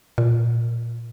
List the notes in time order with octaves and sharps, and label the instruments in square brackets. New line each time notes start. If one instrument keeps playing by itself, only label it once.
[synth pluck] A#2